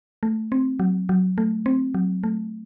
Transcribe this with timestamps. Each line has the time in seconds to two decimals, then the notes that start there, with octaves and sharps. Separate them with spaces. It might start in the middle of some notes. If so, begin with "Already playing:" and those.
0.23 A3
0.52 C4
0.80 F#3
1.09 F#3
1.38 A3
1.66 C4
1.94 F#3
2.23 A3